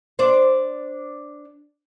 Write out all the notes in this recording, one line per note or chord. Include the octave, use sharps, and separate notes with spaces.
D4 C5